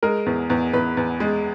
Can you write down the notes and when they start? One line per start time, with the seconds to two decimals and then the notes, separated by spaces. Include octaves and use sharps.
0.03 G#3 A#4
0.26 E2
0.50 E2
0.73 E2 B4
0.97 E2
1.20 G#3